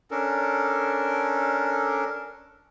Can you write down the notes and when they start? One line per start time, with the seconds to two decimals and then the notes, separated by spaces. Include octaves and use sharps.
0.11 C#4 D4 A4 A#4